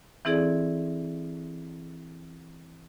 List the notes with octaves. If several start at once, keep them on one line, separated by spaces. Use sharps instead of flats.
E3 C4 E4 G#4 A4 D5